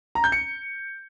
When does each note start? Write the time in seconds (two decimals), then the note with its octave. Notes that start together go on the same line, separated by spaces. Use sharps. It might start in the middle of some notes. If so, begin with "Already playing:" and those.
0.15 A#5
0.24 G6
0.32 C#7